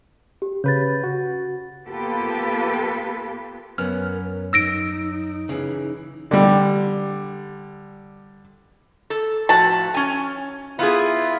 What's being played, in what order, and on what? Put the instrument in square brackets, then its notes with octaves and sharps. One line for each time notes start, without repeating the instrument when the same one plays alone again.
[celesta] G4
[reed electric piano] C#3 B4 [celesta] G6 A6
[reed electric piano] F#4
[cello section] A#3 B3 F4 G4 A4 B4
[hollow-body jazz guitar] F#2 B3 C#4 [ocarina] A#4 [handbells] F6
[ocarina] D#4 [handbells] E6 A#6 D7
[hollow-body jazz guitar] C#3 E3
[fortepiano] D3 G3
[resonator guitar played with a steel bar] A4
[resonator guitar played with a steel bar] A2 F3 F#4 [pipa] A5
[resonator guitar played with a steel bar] C#4 G#5
[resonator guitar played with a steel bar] B3 G#4 [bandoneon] E4 F4